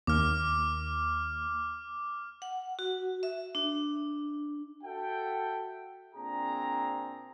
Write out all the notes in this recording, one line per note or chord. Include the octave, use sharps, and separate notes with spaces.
D#2 D6 F6
F#5
F#4
E5
D4
F#4 A4 E5 F#5 G5
A#2 C4 D4 G#4 A#5